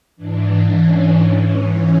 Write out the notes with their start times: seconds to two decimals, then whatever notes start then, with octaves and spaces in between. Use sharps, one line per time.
0.16 G#2 E3 D4
0.70 C#4
1.24 G#2 E3 C#4